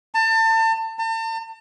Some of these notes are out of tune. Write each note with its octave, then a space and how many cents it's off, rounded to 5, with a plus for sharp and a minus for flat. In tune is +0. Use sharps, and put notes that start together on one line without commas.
A5 +30
A5 +40